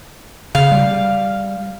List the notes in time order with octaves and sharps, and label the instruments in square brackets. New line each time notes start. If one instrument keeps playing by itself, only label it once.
[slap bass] C#3 [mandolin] F5
[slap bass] G3